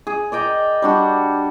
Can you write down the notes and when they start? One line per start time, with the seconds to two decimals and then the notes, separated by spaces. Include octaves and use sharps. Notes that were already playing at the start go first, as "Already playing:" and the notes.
0.07 G#4
0.32 D5 D#5 G5 A#5
0.82 G3 D4 F#4